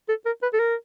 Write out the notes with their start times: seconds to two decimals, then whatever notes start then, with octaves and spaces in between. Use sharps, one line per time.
0.09 A4
0.26 A#4
0.43 B4
0.53 A4
0.60 A#4